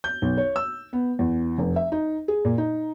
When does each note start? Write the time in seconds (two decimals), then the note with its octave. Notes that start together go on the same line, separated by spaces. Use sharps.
0.04 G6
0.22 B1
0.37 C#5
0.56 E6
0.93 B3
1.19 E2
1.58 F1
1.76 E5
1.92 D#4
2.28 G#4
2.45 A#2
2.58 D#4